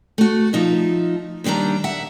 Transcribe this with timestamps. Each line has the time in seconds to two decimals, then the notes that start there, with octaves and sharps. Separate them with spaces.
0.18 A3 F#4
0.53 F3 D#4 E5
1.44 D#2 D#3 G3 D4 A#5
1.84 E5 F#5